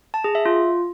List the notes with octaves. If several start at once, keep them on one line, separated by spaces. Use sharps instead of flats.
A5
G#4
E5
F4